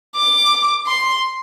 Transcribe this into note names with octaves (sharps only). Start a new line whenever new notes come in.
D6
C6